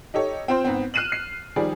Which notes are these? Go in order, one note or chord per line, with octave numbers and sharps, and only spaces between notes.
D#4 G4 A4 C#5
C4 F4 C5
G#2 B3 C4
F6 F#6 C7 D#7 E7 F#7
C7
D#3 F3 G3 G#4 D5